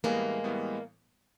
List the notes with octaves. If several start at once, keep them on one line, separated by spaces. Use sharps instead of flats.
A2 E3 G3 G#3 A#3 B3
A2 E3 G3 B3